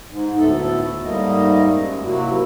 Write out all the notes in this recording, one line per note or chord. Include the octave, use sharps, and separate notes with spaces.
G#2
D2 A2 A3 B3 A4
G#2 G3 A3 A#3 D#5
F#2
C3 F#3 A#3 E4 F#4